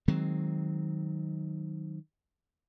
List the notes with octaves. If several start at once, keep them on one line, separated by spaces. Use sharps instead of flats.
D#3 F#3 G#3 C4